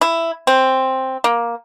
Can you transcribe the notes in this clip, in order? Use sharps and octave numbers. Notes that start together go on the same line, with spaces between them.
E4
C4
A#3